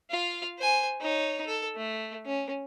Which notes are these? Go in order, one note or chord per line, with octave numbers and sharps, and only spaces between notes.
F4 F5
C5 G#5
D#4 C#5
A4
A3
C#4